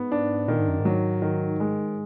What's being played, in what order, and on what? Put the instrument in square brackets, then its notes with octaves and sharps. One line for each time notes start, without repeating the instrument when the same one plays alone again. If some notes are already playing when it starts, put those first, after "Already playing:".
Already playing: [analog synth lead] G#2 [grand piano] B3
[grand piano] D4
[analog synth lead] A#2 [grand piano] D#3
[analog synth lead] G#2
F#2
G#2
[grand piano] F#3
D#3
G#3